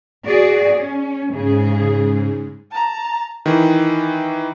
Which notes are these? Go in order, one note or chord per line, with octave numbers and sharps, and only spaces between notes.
F#4 G#4 D5
C#4
G#2 C#3 G#4
A5 A#5
D#3 E3